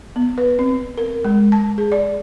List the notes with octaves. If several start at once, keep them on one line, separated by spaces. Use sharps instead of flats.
B3
B4
C4
A#4
G#3
A5
G#4
D5